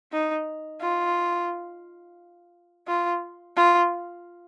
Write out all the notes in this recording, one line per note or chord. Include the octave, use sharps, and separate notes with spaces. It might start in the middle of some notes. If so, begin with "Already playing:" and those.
D#4
F4
F4
F4